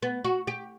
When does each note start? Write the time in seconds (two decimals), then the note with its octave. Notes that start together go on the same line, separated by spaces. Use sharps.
0.03 B3
0.25 F#4
0.47 G4